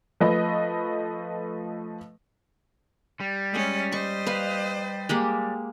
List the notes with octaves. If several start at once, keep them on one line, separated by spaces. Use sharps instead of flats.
F3 A3 B4 D#5
G3
G#3 C#4
C5 D#5 C#6
B4 F5
G#3 A#3 G4